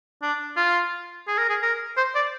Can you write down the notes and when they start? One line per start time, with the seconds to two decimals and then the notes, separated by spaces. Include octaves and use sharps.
0.22 D4
0.57 F4
1.28 G#4
1.38 A#4
1.49 G#4
1.62 A#4
1.97 C5
2.15 D5